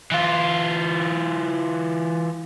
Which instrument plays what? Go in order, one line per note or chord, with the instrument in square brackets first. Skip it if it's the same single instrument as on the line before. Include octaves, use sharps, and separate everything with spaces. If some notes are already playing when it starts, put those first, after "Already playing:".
[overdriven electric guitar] E3 F4